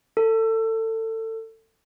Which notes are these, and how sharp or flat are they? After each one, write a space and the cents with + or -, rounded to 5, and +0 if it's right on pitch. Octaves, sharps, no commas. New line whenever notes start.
A4 +25